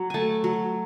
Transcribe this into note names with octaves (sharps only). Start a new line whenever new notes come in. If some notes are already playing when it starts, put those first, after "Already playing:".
Already playing: F#3
A3 G#5 A5
F#3